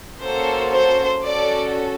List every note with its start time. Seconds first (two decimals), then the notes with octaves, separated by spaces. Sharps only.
0.22 A#3 C#4 F#4 A4 C5
0.73 C5
1.23 C#4 F#4 A4 D5